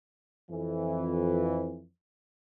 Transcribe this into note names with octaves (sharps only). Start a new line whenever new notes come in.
F2 E3